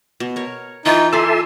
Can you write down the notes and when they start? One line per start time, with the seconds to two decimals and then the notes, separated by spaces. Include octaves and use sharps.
0.20 B2
0.36 A#4 C#5
0.86 E3 D#4 F4
1.13 A4 D5 E5 G#5 C6